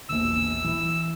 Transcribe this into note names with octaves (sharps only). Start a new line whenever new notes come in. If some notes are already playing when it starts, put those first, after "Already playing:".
E1 A#1 E6
E3